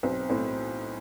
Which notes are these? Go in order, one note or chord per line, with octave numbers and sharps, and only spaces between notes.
B1 C4
A2 C4